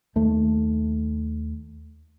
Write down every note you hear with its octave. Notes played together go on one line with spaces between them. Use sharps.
D#2 A3